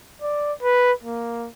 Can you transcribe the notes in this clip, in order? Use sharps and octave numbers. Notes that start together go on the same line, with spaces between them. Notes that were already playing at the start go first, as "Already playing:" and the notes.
D5
B4
A#3